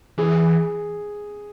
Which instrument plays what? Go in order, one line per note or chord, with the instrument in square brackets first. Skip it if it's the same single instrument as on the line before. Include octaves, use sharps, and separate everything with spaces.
[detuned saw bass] E3 [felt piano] G#4